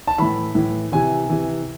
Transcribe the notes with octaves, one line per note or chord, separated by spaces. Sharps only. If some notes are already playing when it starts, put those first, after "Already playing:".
A5
A2 E3 B5
A2 E3
C3 E3 G#5
C3 E3